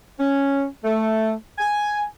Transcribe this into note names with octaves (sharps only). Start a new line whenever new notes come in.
C#4
A3
G#5